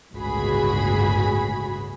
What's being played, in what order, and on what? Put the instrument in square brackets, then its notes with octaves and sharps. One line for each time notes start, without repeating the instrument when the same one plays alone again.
[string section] G1 C#2 A2 F#4 G#4 B5